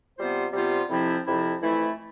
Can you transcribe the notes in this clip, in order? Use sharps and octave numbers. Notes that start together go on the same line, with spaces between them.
C3 G3 B3 F4 C5
C3 G3 B3 F4 C5
F2 C3 F3 C4 E4
F2 C3 F3 C4 E4
F2 E3 A3 E4